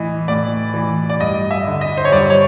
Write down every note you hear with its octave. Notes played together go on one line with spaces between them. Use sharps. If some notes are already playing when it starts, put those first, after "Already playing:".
Already playing: A2 E3 D#5
A2 D5
E3
D5
G2 D#5
E5
D3
D#5
C5
C#5
G2 D5
C#5